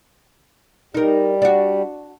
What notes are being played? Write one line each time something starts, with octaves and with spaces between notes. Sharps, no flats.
G3 D#4 A#4
D4 F#4